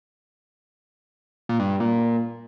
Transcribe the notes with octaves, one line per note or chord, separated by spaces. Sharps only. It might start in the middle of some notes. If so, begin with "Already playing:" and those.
A#2
G2
G2
A#2